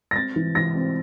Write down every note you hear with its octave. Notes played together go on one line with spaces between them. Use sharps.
A#6
C4 A6
E3
E3 A#6
C4